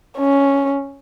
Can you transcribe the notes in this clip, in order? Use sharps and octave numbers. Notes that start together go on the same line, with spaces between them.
C#4